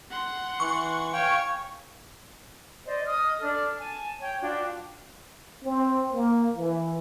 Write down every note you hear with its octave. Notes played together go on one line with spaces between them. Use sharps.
F#5 C6
E3 C#6
C#5 F5 G5 G#5
C5 D5 D#5
D#5 D#6 F6
D4 A4 F6
G#5 A5
C#5 G5
D4 F4 F#4 G5
C4
A#3
E3